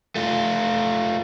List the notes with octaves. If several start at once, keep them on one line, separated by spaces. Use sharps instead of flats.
A3 F4